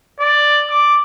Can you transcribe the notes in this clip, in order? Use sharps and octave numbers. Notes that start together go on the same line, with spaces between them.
D5
D6